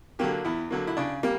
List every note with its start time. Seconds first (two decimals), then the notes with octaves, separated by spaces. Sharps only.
0.19 D3 F#3 A#3 G4
0.45 E2 E4
0.71 D3 F#3 A#3
0.87 E4
0.97 C#3 D4
1.23 G3 A#3